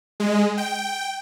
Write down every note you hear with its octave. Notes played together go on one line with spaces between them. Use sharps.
G#3
G5